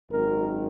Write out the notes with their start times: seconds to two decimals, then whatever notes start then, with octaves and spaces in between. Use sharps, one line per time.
0.10 G#1 F#2 D#3 F#3 A#4